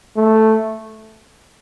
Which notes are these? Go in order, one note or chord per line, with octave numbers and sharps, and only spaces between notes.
A3